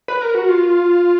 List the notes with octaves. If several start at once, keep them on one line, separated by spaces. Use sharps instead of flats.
B4
A#4
F#4
F4